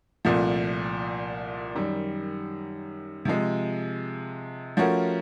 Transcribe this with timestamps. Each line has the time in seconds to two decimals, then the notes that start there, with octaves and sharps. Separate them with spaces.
0.25 C2 A#2 F3 A3
1.75 F#2 D#3 G3
3.25 C3 F3 G#3
4.77 F3 A3 C#4 F#4 A#4